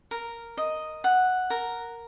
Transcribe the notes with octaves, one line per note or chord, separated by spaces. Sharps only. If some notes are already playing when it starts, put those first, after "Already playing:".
A#4
D#5
F#5
A#4